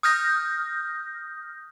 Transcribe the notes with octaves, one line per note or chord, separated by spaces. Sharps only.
D#6 F6 G6 A#6